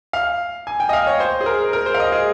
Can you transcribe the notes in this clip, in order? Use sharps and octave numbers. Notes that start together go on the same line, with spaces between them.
F5
G#5
G5
D#5
F5
C#5
C5
G#4
A#4
A#4
C5
F5
D#5
G#4